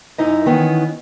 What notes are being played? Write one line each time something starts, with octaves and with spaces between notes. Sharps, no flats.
F#2 D#4 E4 C#5 D#5
D#3 E3 B3 C#4